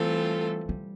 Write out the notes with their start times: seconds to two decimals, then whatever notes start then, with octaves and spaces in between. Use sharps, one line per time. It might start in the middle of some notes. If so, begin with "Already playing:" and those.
Already playing: E3 G3 A3 C4 F4 A4
0.69 G3